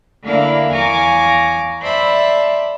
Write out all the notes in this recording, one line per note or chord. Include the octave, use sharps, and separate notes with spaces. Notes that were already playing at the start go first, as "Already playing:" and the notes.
D3 A#3 D4 E4 F5
E2 F5 G#5 A#5 C#6 D6
C5 D5 E5 A5 B5